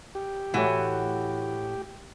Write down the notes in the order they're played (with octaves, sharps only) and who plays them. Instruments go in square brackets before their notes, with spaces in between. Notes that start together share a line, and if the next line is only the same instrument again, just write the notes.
[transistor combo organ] G4
[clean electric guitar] A2 A3 C#5 [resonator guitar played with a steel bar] E3 F#4